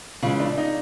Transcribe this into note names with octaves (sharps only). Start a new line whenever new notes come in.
C#3 E3 G#3 F4
D4
D#4